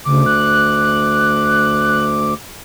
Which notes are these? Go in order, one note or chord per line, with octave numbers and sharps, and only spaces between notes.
D2 C#3 D6
F#6